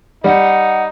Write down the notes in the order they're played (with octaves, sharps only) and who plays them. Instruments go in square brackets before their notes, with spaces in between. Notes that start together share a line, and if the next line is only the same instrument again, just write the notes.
[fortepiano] G3 [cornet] D#4 [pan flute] F#5